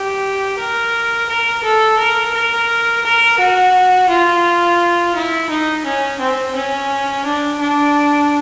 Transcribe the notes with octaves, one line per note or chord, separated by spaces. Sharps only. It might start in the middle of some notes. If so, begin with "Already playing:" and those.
Already playing: G4
A#4
A#4
A4
A#4
A#4
A#4
F#4
F4
E4
D#4
C#4
C4
C#4
D4
D4